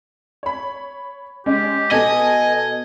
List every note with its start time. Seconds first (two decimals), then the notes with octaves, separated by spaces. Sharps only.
0.43 C#5 B5
1.46 G#3 C#4 G4
1.91 B2 A4 D#5 G#5